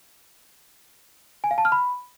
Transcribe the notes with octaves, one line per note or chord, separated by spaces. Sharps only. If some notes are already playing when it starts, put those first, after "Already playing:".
G#5
F5
A5
F6
B5